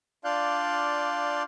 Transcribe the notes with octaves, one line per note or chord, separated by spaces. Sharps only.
D4 F4 D5 F5 F#6 G6